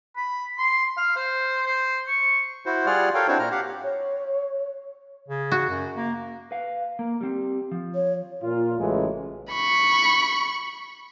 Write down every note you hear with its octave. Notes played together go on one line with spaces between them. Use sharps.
B5
C6
F5
C5
C5
C#6
E4 F#4 C5
G3 F4 G#4 D5 F#5 F6
A4 A#4 C#5 F5 G5
C4 D4 E4 F#4 C5 C#5
A#2 A#5 F6
G4 F5 F#5
C#5
C#3
F#4
F#2
A#3
B4 F5
A#3
G3 C4
F3
C#5
A#2 F4
A1 F#2 C#3 E3 G#3
B5 C#6